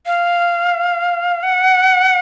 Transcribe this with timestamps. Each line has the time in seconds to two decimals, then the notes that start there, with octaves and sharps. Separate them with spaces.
0.06 F5
1.43 F#5